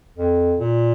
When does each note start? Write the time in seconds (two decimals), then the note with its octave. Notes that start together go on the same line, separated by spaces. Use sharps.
0.17 F2
0.59 A#2